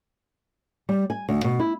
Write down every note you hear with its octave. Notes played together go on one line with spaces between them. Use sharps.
G3
G#5
D2
B2
E4